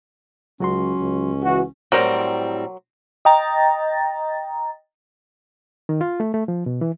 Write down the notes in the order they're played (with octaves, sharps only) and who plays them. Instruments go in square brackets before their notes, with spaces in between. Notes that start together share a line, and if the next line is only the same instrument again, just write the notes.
[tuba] C#2 [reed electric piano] F#3 F#4 C6 [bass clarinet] C#4
[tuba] C#2
[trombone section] E3 F#4
[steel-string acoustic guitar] A2 G3 C4 [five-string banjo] F#3 A#4 C5
[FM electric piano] D#5 G5 A#5 A6
[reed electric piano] D#3
F4
A3
A3
F3
B2
E3